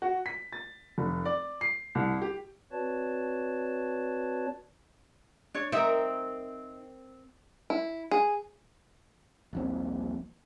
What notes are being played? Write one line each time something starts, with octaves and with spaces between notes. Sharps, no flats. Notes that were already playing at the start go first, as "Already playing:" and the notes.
F#4
B6
A6
F1
D5
C7
C2
G4
C4 F#4 B4 C#5 D5 A5
D4 C#5
C4 D#4 A#4 E5
E4
G#4
D#1 A#1 C4